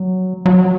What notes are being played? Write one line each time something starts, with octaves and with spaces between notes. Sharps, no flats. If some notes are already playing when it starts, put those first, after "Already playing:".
Already playing: F#3
F#3